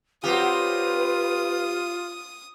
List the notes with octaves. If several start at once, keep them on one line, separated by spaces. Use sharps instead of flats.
F#3 C4 F4 G4 B4 D#6